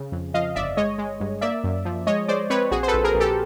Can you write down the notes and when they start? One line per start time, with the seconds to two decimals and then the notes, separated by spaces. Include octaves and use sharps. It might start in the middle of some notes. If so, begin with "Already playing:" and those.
Already playing: C#3
0.12 F2
0.34 F3 D#5 F5
0.56 G1 D5 E5
0.77 G#3 C#5 D#5
0.98 G#3
1.20 G2
1.41 A#3 D5 E5
1.64 F#2
1.85 F3
2.07 G#3 C#5 D#5
2.28 G#3 C5 D5
2.50 C4 B4 C#5
2.71 A#1 F#4 G#4
2.83 C5
2.88 A4 B4
2.94 A#1
3.04 G#4 A#4
3.14 A#1
3.20 G4 A4